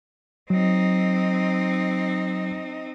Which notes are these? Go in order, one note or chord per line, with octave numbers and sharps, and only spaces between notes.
F#3 C4 D#4